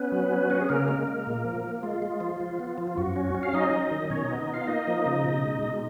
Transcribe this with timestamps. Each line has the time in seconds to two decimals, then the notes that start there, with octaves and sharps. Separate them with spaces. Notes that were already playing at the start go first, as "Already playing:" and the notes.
Already playing: B3 C#4 B4
0.12 F#3
0.31 C#4
0.50 C#4 F#4
0.61 G#4
0.69 C#3 A#3 A#4
0.88 G#3
1.07 G#3
1.27 A#2
1.45 F3
1.64 A#3
1.83 G#3 F4
2.02 G#3
2.21 F3
2.40 F3
2.59 B3
2.78 F3
2.87 F4
2.98 F#2 F#4
3.16 C#4
3.35 C#4
3.43 F5
3.53 F#3 D#4 D#5
3.73 F#3
3.91 D#3
4.10 B2 C#4 C#5
4.25 D#4 D#5
4.30 B3
4.39 D#4 D#5
4.48 B3
4.54 F4 F5
4.67 A#3 D#4 D#5
4.87 F3
5.06 C#3
5.24 B2
5.44 G#3
5.63 B2